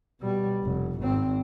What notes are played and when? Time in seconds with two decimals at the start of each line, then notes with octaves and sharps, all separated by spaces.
0.20 B2 G3
0.64 F1
1.01 G#1 C4